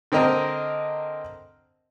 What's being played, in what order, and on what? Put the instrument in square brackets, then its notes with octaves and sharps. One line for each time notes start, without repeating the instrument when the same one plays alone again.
[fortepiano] D3 C4 A#4 D#5 A#5